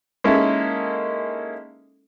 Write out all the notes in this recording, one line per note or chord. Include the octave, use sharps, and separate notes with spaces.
G#3 A#3 C#4 D#4 E4 A4